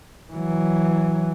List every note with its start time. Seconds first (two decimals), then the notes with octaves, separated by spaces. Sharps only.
0.32 E3 F#3